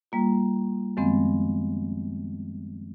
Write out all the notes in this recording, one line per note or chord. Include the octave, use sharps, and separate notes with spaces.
G3 A#3 F4
F#2 D#3 F3 G#3 B3 C4